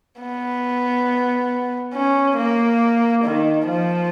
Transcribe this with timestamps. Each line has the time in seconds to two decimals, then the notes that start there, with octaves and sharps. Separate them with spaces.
0.21 B3
1.94 C#4
2.37 A#3
3.25 D#3
3.68 F3